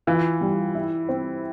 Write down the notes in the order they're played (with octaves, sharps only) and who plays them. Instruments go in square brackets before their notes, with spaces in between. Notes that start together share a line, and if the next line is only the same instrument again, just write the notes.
[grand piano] E3 [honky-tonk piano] F4
[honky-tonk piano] G3
E4
C4